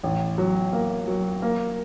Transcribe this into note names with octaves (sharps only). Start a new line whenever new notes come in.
A1
F#3
A#3
F#3
A#3